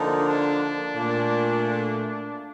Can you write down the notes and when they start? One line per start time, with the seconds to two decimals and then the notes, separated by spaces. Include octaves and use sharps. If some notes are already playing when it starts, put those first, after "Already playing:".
Already playing: D3 F3 A#3 D#4
0.27 D4
0.94 A#2 A3